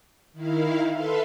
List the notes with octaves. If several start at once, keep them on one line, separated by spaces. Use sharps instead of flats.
D#3 E4 F5
A4 B4 E5 F5 C6